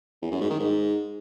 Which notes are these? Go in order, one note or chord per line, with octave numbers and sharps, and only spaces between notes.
E2
F#2
G#2
D#3
G#2